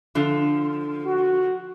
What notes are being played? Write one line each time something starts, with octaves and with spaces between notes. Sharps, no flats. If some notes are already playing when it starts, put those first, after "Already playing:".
D3 F3
F#4